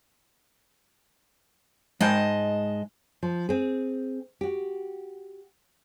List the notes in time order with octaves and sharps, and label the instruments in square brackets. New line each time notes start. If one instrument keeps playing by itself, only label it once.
[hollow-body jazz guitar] G#2 G5 [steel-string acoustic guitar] G#3 D#5 A5
[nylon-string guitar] F3
C4 G#4
F#4 G4